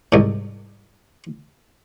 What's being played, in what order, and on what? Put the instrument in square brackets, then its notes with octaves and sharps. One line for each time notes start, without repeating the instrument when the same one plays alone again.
[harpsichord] C2 G#2